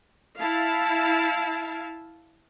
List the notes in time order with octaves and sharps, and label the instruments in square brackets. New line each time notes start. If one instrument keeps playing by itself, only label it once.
[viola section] E4 F5 A5